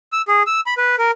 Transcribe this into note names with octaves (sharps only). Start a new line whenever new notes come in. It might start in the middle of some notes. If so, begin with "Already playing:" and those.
E6
G#4
E6
B5
B4
A#4